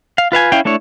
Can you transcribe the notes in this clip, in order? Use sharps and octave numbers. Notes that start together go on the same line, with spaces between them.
F5
F4 B4 F5 G#5
C#4 E4 F5 G5
A3 D4 E4 C#5